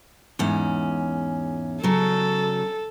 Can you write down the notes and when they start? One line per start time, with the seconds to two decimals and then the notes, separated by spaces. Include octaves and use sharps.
0.39 E2 G#2 C#4
1.84 C#3 F#3 A4